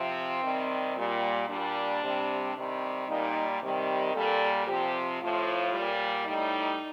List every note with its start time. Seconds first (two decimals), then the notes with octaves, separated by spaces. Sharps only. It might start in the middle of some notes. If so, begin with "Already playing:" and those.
Already playing: C3 F3 C4
0.43 C3 D#3 G3
0.97 A#2 G3
1.49 A#2 G3 D4
2.02 C3 G3
2.56 C3 D#3 G3
3.08 A#2 G3 D#4
3.61 C3 D#3 G3
4.15 A#2 G3 A4
4.68 C3 F3 G4
5.20 A2 F3 F4
5.73 A#2 G3
6.26 A2 G3 D#4